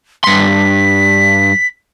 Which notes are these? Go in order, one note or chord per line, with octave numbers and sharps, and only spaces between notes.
G2 C6 B6